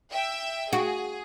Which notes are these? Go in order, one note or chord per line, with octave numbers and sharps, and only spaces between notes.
E5 G5
F#4 G#4